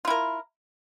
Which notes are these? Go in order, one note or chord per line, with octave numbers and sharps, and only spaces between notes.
E4 F4 A#4